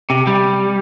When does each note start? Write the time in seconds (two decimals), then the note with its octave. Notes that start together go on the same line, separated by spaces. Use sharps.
0.10 C3
0.27 G3